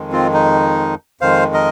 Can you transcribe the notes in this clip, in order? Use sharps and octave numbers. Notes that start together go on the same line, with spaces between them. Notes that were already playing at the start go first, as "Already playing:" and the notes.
Already playing: F2 D#3 G#3
C4 F4
D#4
F2 D#3 G#3 C5 F5
A#4 D#5